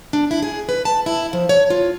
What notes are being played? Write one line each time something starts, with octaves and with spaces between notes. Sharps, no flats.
D4
E4
G#4
B4
A5
E4
F3
C#5
F4